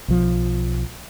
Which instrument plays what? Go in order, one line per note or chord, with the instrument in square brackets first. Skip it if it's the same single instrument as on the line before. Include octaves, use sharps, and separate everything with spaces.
[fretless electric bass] B1 F3